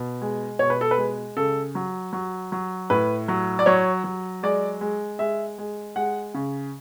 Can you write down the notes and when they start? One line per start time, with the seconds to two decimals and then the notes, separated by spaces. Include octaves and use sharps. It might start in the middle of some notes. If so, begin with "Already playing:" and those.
Already playing: B2
0.22 G#3
0.59 B2 C#5
0.70 B4
0.81 A4
0.91 B4
0.98 G#3
1.37 C#3 A4
1.75 F#3
2.13 F#3
2.52 F#3
2.90 A2 B4
3.28 F#3
3.59 D5
3.66 F#3 C#5
4.04 F#3
4.43 G#3 D5
4.81 G#3
5.19 G#3 E5
5.58 G#3
5.96 G#3 F#5
6.34 C#3